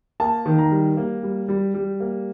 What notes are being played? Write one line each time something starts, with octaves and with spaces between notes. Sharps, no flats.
A#3 A5
D#3
A#5
G3
A#3
G3
G3
G3
A#3